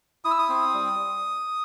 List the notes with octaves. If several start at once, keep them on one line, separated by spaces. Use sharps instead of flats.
E4 D#6
E6
D#6
C4
G3